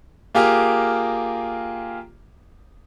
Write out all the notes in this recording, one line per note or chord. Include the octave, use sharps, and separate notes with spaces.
A#3 F4 G4 G#4 A#4